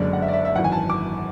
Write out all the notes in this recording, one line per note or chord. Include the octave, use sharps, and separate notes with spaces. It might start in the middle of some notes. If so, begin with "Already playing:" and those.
Already playing: F#1 F#2 D3 G#3 D4
F#5
E5
D5
E5
E5
G#1 F#2 E3 F#5
G#5
A5
D6